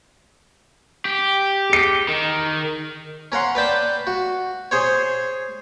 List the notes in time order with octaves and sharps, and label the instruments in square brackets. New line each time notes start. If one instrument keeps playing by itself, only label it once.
[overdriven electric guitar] G4
[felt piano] G#4 C#7
[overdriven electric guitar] D#3
[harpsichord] C#4 A#4 F#5 C6
B4 D5 G5 A5
F#4
G#4 C5 C#5